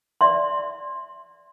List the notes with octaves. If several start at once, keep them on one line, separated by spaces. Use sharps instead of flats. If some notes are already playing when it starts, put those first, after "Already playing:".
D5 E5 C6